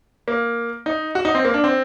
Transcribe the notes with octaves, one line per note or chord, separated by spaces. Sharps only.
A#3
D#4
F#4
D#4
C4
A#3
D4
C4